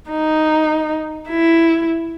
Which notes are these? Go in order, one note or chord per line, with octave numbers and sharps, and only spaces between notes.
D#4
E4